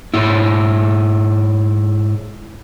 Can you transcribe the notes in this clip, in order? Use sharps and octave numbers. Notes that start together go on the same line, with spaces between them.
G#2 E4